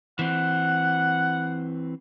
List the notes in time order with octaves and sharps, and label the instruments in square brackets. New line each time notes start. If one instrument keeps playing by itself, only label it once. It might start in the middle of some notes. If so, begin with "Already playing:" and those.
[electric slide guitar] E3 C4 [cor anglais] F#5